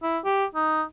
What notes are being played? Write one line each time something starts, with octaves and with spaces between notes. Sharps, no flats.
E4
G4
D#4